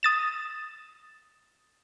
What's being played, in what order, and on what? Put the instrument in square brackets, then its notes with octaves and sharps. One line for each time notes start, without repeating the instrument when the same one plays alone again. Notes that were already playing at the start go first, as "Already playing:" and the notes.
[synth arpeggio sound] D#6 A6 E7